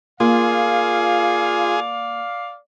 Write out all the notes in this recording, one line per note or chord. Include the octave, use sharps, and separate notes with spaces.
A#3 F4 G#4 D5 F5